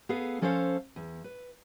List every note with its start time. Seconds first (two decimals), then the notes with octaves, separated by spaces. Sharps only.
0.09 B3 G#4 A4 F5
0.42 F3 C#4 A4 C5 C#5 F5
0.96 E2
1.24 B4